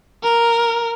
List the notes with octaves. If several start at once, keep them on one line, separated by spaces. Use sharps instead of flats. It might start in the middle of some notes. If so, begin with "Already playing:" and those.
A#4